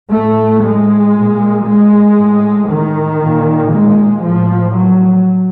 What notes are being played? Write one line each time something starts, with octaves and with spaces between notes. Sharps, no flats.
A2 A3
G#3
A#2
G#3
A2
D#3
A#2
G#3
A2 F3
F#3